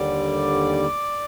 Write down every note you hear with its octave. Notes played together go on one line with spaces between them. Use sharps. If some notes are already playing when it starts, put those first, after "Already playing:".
Already playing: D#2 D3 G3 D5